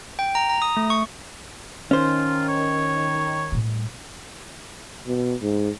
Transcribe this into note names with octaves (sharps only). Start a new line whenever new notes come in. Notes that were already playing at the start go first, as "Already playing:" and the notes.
G5
A#5
A#5
D#6
A3
C#6
D#3 C#4 F4 C5
C#5
A2 G3
B2
G#2